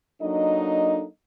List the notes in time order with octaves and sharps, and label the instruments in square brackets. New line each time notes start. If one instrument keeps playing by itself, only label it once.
[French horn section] F#3 A#3 D4 D#4 A4 D#5